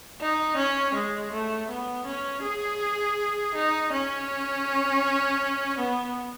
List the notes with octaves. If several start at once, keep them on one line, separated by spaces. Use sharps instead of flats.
D#4
C#4
G#3
A3
B3
C#4
G#4
D#4
C#4
B3